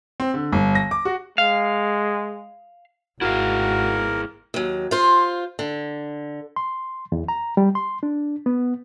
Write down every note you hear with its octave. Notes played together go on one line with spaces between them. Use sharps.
C4
D3
G1
A#6
D6
F#4
G#3 F5
G#1 E4 F#4 G#4 A#4 F5
D#2 F#3
F4 C5
D3
C6
E2
A#5
G3
C6
D4
B3